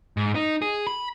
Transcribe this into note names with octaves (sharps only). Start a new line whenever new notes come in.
G#2
D#4
G#4
B5